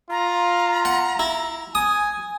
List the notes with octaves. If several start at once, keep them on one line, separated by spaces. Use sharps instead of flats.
F4 A#5
F#5
E4
G#5 D#6